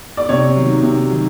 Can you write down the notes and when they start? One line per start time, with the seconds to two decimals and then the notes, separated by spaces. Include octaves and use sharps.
0.17 D5
0.29 C3 C#5
0.56 D#3 F#3
0.83 C3
1.10 D#3 F#3